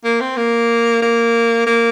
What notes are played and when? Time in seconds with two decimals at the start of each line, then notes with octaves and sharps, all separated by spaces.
0.04 A#3
0.21 C4
0.37 A#3
1.02 A#3
1.67 A#3